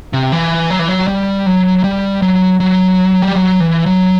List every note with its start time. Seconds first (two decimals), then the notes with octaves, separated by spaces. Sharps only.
0.13 C3
0.32 E3
0.70 F#3
0.79 E3
0.89 F#3
1.07 G3
1.46 F#3
1.84 G3
2.22 F#3
2.60 F#3
3.22 G3
3.36 F#3
3.60 E3
3.86 F#3